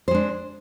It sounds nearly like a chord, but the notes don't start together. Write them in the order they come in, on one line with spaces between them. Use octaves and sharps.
C5 G#3 D4